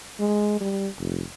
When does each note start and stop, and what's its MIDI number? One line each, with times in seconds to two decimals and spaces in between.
0.19 0.57 56
0.60 0.88 55
0.99 1.22 29